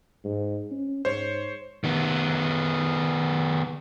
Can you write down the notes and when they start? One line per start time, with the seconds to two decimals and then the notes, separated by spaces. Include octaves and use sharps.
0.24 G#2
0.72 C#4
1.05 G#2 C5 C#5
1.84 D#3 B3